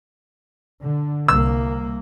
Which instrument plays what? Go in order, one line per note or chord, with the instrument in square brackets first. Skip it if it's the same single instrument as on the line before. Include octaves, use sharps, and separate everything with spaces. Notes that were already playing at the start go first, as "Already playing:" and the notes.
[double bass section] D3
[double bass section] C2 A#3 [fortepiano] E6